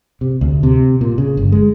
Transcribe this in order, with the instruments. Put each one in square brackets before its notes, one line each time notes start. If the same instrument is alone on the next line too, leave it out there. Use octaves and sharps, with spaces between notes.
[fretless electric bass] C3
D2
C3
A#2
C#3
G1
G#3